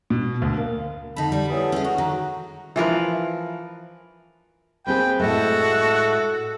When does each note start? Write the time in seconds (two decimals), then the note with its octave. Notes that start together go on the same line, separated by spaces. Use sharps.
0.10 B2
0.42 D2
0.57 A#3
1.16 F2 D3 D#4 A5 B5
1.32 G3 D5
1.50 E3 B3 A4 C#5 D#6
1.72 C#4 G#4
1.84 F#4 A#4
1.98 D#3 F#3 A#5
2.76 E3 F3 A#4 B4
4.87 A#3 C4 G#4 B4 G5
5.20 A2 G#3 A3 F#4 A4